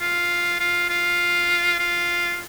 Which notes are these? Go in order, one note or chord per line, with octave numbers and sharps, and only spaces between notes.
F4
F4
F4
F4